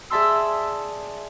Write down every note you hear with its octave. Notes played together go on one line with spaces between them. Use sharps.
G#4 D5 E5 A5 C6 E6